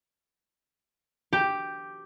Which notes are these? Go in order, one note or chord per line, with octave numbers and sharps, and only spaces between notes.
G4